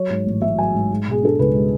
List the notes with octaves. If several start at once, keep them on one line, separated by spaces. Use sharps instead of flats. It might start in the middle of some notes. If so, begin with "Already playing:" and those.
Already playing: F#3 C#5
G#2
A1
A1 E5
F#3 G#5
G#2
G#3
B2 G#4
D4 A4
C#2 B4
G#3